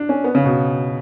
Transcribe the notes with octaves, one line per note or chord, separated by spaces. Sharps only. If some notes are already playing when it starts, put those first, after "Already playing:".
Already playing: D4
C#4
B3
C#3
B2